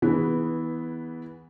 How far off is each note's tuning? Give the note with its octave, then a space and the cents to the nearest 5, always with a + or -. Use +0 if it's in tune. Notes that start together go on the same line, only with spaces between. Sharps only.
E3 -25 B3 +0 G#4 -20